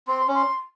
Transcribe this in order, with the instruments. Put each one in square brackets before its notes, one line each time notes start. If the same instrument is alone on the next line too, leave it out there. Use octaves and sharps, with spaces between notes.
[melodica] C4 [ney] C6
[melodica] C#4
[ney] C6